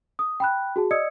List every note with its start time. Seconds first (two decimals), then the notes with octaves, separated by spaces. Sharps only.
0.19 D#6
0.40 G5 B5 F#6
0.76 F#4 G#4 A5
0.91 D5 D#5 D#6 E6 G#6 C#7